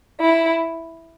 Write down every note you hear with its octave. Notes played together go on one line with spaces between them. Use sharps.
E4